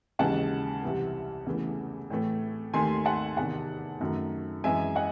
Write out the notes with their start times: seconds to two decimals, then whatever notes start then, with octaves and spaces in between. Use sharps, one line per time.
0.19 D#2 C#3 E3 G#3 F#5 A5
0.82 C2 C3 E3
1.46 E2 C#3 E3 A3
2.10 A2 E3 A3
2.74 D#2 D#3 A3 G#5 C6
3.05 F#5 A5
3.37 E2 C3 D#3 F#5 A5
4.00 F#2 D#3 F#3 A3
4.64 F#2 E3 G#3 E5 G#5
4.96 D#5 F#5